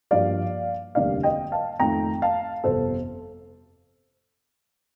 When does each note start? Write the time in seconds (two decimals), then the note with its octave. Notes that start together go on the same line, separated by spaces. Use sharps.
0.11 G2 F3 A#3 D5 F5
0.95 F1 D#2 D3 G3 A#3 D5 F5
1.23 D#5 G5
1.52 F5 A5
1.79 F2 D#3 A3 G5 A#5
2.22 F5 A5
2.64 G1 F2 C3 A4 C5